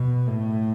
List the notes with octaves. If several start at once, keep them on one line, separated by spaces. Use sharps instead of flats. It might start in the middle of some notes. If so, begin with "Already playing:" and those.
Already playing: B2
A2